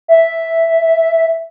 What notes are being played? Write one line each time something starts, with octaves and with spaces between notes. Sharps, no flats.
E5